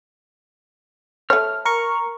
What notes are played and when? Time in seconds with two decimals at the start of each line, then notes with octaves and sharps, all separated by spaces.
1.30 A3 C#5 F6
1.65 A#4 C#6